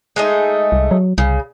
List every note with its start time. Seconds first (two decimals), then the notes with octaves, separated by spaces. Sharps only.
0.16 G#3 A3 D#4
0.72 C2
0.91 F#3
1.18 C2 C#3